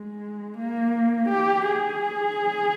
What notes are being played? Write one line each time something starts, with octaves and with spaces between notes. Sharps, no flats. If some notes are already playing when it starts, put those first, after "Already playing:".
Already playing: G#3
A#3
G4
G#4